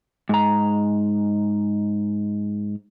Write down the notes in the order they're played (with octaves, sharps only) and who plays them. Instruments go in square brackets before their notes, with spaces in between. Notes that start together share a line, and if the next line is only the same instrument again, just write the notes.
[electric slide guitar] G#2 A#5